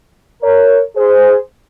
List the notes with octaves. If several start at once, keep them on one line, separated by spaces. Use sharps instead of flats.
A#4 C#5
G#4 C5